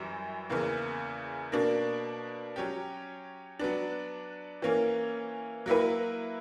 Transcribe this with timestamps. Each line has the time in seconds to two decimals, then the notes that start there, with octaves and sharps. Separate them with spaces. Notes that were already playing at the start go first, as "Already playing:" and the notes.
Already playing: F#2 E3 G3
0.50 E2 C#3 E3 A#3
1.52 B2 A#3 D4
2.56 F#3 C#4 G4
3.59 F#3 B3 D4
4.62 E3 A#3 C#4
5.66 F#3 A#3 E4 B4